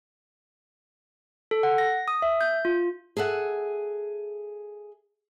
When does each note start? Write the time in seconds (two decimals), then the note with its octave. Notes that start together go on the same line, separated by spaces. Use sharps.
1.51 A4
1.63 F#5
1.78 A#6
2.08 D#6
2.22 E5
2.41 G6
2.65 F4
3.17 G#4 A4 E5 F#5